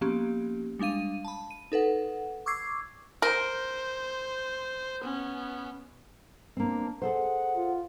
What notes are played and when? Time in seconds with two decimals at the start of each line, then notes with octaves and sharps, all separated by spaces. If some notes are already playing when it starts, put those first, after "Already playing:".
0.01 F3 A#3 B3 C#4 G4
0.79 G3 G#3 D4 F5 D#7
1.25 A5 B5
1.51 D#7
1.72 D#4 A4 B4 F#5
2.46 C#6 D6 E6 G#6 C7
3.22 A#4 C5
5.00 B3 C#4
6.57 A#3 C4 D4
7.02 G#4 A4 C5 F#5
7.56 F4